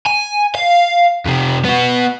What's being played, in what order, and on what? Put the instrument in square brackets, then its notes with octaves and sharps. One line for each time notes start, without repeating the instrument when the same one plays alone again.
[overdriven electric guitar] G#5
F5
F2 C3
B3 F#4